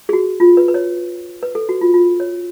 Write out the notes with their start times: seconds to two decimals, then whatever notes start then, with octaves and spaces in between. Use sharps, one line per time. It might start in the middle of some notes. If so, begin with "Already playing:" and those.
0.09 G#4
0.13 F#4
0.40 F4
0.57 B4
0.68 B4
0.74 C#5
1.43 B4
1.55 A4
1.69 F#4
1.81 F4
1.94 F4
2.20 C#5